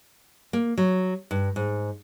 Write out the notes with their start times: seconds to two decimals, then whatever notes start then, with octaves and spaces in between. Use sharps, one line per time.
0.53 A#3
0.78 F#3
1.31 G2
1.56 G#2